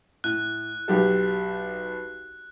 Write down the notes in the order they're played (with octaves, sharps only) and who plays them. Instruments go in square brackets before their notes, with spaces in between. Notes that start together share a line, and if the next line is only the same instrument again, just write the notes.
[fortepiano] A2 [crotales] F#6
[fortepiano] B1 G4 A4